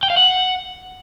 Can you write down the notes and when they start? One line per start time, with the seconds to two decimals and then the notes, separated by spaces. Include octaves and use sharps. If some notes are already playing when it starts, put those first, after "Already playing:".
0.03 G5
0.10 F5
0.17 F#5